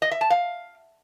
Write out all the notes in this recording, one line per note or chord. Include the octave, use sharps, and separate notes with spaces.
D#5
E5
A5
F5